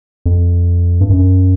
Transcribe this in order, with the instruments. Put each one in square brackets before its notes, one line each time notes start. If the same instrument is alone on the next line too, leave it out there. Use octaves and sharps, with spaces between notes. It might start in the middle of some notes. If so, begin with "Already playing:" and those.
[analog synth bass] F2
G2
F#2